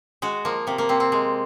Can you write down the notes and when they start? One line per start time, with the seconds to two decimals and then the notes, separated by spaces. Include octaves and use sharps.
0.22 G#3 F#4
0.45 F3 A#3
0.67 C3 A#3
0.78 A#3
0.89 C3 C4
1.00 C4
1.12 G#3